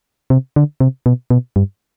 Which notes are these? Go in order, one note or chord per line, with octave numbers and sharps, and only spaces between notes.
C3
D3
C3
B2
B2
G2